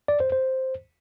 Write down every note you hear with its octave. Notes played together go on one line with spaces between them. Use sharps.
D5
C5
C5